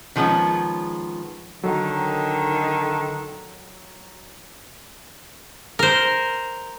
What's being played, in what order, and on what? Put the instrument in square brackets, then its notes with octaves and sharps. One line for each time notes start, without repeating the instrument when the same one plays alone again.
[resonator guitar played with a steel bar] D#3 F3 G#3 A#3 B3 C#4
[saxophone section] D3 D#3 [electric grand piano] F#3
[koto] A#4 C5